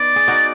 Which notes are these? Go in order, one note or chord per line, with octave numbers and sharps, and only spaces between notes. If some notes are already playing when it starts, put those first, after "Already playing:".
Already playing: B3 D#4 D5
G#4
D#4 F#4